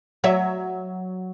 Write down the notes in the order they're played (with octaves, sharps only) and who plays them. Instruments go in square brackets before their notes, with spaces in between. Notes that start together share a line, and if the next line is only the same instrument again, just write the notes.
[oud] F#3 C#5 E5